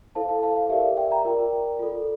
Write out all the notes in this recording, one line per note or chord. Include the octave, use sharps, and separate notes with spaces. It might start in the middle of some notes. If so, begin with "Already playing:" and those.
E4 A4 C5 F5 A5
F5 A5
F5 A5
F5
G4 A#4 D5 E5
E5 G5
G5 A#5
F4 A#4 D5
F4 A4 D5